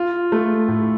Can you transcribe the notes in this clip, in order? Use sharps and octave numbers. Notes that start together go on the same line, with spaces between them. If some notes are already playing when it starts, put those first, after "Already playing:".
Already playing: F4
A3
A2